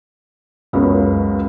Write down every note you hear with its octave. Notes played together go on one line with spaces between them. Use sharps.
C#2 F#2 C#3 G#3 B3 C#4